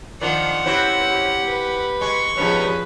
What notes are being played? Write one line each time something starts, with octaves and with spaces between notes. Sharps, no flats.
D#3 F3 D4 F4 F#5
C4 C#4 E4 F#4 G4 B4
G4
B4
G#3 C#6
G2 F3 B3 C#4 D#4 G#4 B4